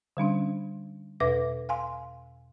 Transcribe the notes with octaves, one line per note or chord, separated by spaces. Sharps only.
D3 G3 C#4 D4
E2 B2 B4 E5 D6 A#6
F5 G#5 C6